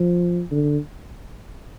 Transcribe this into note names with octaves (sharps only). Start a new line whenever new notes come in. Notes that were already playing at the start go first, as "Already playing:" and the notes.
Already playing: F3
D3